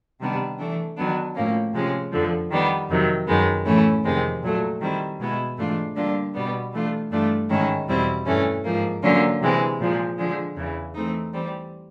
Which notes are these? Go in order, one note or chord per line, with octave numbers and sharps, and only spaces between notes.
C3 D#3 G3 B3 D4
E3 A3 D4
D#3 F#3 B3 D4
A2 F3 A#3 C#4
C3 F3 G#3 C#4
F2 D3 F3
D#3 G3 B3
F2 C3 D#3 F#3
F#2 D#3 G#3 B3
A2 E3 A3 C#4 E4
F2 C3 D#3 G#3 C4
A#2 F#3 A3
D#3 G3 C4 E4
B2 G#3 B3 E4
G#2 E3 A3 D4 F4
D3 G3 A#3 D4 F4
B2 G3 B3
E3 A3 D4 F4
G2 E3 A3 D4 F4
G#2 D#3 G#3 C#4 E4
E2 B2 G3 C4 E4
G2 E3 A3 C#4
G#2 F3 A#3
D3 F#3 A#3 C#4 F4
C3 E3 G#3 C4
A#2 F3 G#3
D3 F3 G#3
E2 C#3 E3
E3 A3 C4 D#4
E3 G3 C4